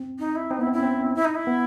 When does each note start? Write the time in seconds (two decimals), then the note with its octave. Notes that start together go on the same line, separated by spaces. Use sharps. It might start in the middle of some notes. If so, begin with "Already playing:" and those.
Already playing: C4
0.19 D#4
0.35 E4
0.51 C4 D#4
0.59 B3 E4
0.67 C4
0.73 C#4 E4
0.83 C4
1.15 E4
1.25 D#4
1.35 E4
1.47 B3